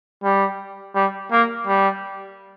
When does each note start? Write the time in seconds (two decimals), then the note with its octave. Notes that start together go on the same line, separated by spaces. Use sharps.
0.23 G3
0.95 G3
1.31 A#3
1.67 G3